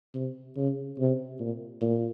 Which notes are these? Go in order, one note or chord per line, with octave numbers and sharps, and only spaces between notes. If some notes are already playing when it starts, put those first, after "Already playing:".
C3
C#3
C3
A#2
A#2